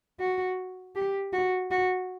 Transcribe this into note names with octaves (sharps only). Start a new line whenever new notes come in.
F#4
G4
F#4
F#4